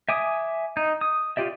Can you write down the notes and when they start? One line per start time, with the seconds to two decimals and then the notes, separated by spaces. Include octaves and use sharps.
0.09 E5 G#5 D6 D#6
0.77 D#4
1.01 D#6
1.37 F4 G4 D5 E5